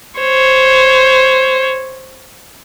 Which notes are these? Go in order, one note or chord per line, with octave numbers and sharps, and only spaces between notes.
C5 C#5